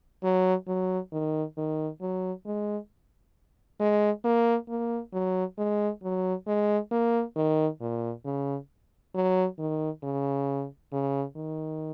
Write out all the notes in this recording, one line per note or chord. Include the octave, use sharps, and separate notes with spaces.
F#3
F#3
D#3
D#3
F#3
G#3
G#3
A#3
A#3
F#3
G#3
F#3
G#3
A#3
D#3
A#2
C#3
F#3
D#3
C#3
C#3
D#3